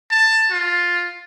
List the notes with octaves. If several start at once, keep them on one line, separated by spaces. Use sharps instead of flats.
A5
F4